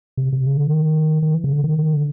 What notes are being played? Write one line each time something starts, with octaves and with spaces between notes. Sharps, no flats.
C3
C3
C#3
D3
D#3
D#3
E3
C#3
D3
D#3
D#3
D3